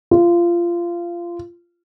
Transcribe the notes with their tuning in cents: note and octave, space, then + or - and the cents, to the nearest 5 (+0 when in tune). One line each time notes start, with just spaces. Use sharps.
F4 -20